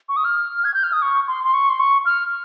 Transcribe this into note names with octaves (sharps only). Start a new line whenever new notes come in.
C#6
D#6
F6
G#6
G6
F6
D#6
C#6
C6
C6
C#6
C6
C#6
F6